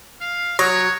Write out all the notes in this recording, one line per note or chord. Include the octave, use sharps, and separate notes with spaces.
F5
F#3 C#5 C#6 D#6 A#6